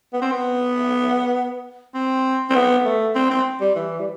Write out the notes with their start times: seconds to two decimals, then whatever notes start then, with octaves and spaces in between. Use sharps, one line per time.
0.13 B3
0.22 C4
0.32 B3
1.94 C4
2.50 C4
2.55 B3
2.85 A3
3.15 C4
3.30 C4
3.61 G3
3.76 E3
3.99 G3